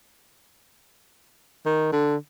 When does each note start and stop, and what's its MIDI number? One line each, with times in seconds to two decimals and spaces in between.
1.66 1.88 51
1.92 2.16 50